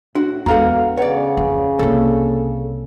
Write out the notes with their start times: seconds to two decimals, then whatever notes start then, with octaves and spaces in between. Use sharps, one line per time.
0.15 A2 D4 F#4
0.46 E2 G#3 B3 F#4 A4 F5 F#5 A#5
0.98 C#3 B4 C#5 D5 F#5
1.37 F2 C#4
1.79 C2 A#3 A4